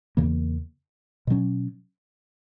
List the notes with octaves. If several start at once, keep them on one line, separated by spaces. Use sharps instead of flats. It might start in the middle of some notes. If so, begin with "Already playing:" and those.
E2 C#3 E3 A#3
B2 F#3 C#4